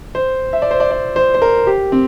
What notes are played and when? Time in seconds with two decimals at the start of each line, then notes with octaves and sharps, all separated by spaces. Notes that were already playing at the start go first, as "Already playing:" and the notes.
0.15 C5
0.53 E5
0.62 D5
0.71 C5
0.80 D5
0.91 D5
1.16 C5
1.34 C5
1.42 A#4
1.67 G4
1.92 C4